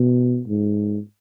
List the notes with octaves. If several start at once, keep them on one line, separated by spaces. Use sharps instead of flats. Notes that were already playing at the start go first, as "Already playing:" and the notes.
Already playing: B2
G#2